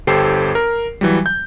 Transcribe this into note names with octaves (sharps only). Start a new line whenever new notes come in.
G1 G4 A4 C5 C7
A#4
E3 F#3 G3
G6